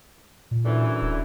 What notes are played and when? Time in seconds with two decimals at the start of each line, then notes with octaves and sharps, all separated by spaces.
0.51 A#2
0.65 F#2 D3 E3
1.02 D1